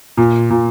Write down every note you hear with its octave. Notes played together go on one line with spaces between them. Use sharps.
A#2
A#2